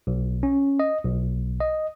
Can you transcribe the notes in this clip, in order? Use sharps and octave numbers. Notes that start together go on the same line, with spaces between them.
B1
C#4
D#5
B1
D#5